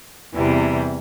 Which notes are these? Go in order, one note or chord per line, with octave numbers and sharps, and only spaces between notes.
E2 C3 E3 G3